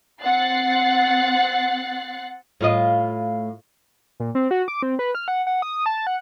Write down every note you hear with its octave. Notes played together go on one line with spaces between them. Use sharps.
C4 F#5 F#6 A6 C7
A2 F4 D#5
A#2
C4
F#4
D6
C4
B4
F6
F#5
F#5
D#6
A5
F#5